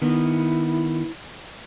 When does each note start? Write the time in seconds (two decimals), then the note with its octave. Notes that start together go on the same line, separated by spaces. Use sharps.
0.02 D#3 B3 E4